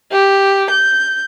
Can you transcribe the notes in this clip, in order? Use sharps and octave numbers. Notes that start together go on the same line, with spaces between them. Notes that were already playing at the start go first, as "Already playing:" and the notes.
G4
G6